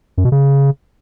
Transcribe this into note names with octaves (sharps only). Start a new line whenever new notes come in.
F#2
B2
C#3